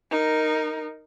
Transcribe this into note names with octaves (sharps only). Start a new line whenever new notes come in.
D#4 A#4